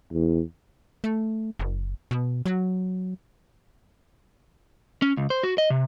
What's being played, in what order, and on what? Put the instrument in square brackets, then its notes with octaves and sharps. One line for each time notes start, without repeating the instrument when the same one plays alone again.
[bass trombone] E2
[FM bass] A3
F#1
B2
F#3
[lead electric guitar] C#4
C#2
C5
F#4
D#5
C3